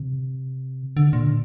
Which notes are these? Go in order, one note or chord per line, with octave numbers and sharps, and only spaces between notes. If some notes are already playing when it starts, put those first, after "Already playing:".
Already playing: C3
D3
A#2